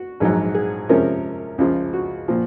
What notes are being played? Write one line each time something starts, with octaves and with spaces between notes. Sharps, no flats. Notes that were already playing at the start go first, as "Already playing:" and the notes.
Already playing: F#4
A#1 G#2 F#3
G#4
C3 F3 G#3 C#4 A#4
C#2 C#3 F3
F#4
A#2 F3